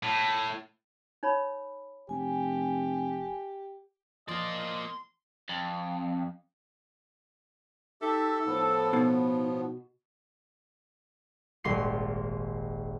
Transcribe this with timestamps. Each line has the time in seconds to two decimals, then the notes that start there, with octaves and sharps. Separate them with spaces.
0.03 A2
1.23 D#4 C#5 B5
2.09 F1 G4 G#5
4.28 F3 A#3 D5 D#5 C6
5.49 F2
8.02 D#4 G4 A4 E5
8.46 A2 F3 B3
8.93 B2 D#4
11.64 D#1 G#1 C6 C7